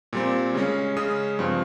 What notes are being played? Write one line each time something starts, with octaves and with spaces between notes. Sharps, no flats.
A#2 G3 C4
C#3 G#3 C#4
C#3 G#3 C#4 D#6
G2 F3 C4